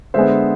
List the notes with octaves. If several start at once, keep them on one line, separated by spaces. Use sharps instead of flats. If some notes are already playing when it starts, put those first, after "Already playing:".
D3 G#3 B3 C5 E5